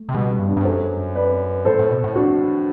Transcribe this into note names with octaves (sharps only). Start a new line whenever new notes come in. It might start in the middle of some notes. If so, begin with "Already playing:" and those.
Already playing: A3
C3
B2 G3 B3
G3
G2
B3 D4
G2
F#2 A4 C5
B4 D5
A2 A4 C5
A2
B2
A2
D4 F#4